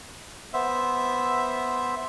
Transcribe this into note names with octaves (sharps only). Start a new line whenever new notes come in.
B3 C5 E5